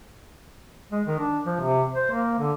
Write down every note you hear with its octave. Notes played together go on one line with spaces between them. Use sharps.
G#3
D#3
D4
F3
C3
C5
A#3
D3